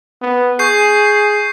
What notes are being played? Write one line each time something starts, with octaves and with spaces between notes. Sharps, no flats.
B3
G#4 C#6 G6 C7